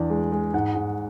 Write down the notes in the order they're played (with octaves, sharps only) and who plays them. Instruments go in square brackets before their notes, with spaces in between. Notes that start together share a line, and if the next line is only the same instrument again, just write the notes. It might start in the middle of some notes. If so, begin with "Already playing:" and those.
Already playing: [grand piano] E2 D4 D5
G#3
G#3
G#2 F#5
G#2